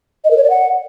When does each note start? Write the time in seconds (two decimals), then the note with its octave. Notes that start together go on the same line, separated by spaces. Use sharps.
0.24 D#5
0.31 A#4
0.37 C#5
0.44 D5
0.50 F#5